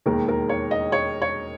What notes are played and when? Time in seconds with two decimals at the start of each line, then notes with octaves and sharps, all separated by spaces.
0.06 E1 D#2 D#3 A#4
0.28 A#4
0.49 C#5
0.71 D#5
0.92 C#5
1.22 C#5